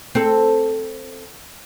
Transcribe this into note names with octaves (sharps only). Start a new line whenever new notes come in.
C4 A4